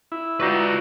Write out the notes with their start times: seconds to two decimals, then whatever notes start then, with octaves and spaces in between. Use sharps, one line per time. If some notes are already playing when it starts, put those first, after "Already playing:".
0.12 E4
0.40 D#4 F4 F#4 B4 D5